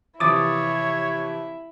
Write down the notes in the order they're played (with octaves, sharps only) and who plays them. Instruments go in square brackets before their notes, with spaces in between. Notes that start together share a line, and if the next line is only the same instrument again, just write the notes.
[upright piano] C3 E3 F3 [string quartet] E4 [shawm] C#5 [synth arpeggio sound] D6 D#6 A6